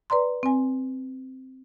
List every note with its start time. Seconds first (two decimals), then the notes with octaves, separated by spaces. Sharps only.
0.10 B4 D5 A#5 C6
0.43 C4 G#5